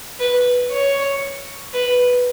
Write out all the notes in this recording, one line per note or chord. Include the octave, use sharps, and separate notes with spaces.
B4
C#5
B4